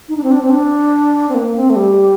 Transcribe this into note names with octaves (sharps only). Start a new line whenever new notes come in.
D#4
D4
C4
D4
C4
D4
C4
A#3
C4
A3
G3